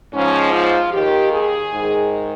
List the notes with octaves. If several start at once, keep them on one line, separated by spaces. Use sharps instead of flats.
G#2 F3 C#4
F4
D#2 D#3 G4
G#4
G#2 D#3